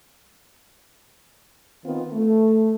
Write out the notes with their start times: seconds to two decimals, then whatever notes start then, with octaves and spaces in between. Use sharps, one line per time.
1.84 D#3 B3 C4 F4
2.13 A3